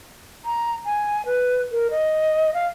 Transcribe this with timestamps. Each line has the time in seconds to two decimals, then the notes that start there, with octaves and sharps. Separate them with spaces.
0.45 A#5
0.85 G#5
1.26 B4
1.72 A#4
1.91 D#5
2.54 F5